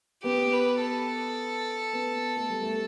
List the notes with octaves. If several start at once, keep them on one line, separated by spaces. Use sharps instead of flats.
B3 G4
B4
A4
B3
A3
G3
A3